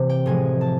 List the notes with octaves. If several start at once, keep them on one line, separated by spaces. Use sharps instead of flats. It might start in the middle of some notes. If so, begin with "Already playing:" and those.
Already playing: C3 E3
G5
A2 F3 G#3 G#5
A5